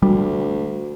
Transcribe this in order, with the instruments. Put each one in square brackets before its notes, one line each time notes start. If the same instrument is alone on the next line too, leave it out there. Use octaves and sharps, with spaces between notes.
[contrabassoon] D2 [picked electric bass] G3